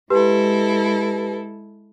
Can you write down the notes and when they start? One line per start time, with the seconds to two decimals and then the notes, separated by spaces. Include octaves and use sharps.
0.10 G#3 E4 G4 A4 B4